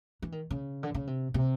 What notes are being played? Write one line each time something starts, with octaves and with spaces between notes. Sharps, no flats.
E3
D#3
C#3
D3
C#3
C3
C3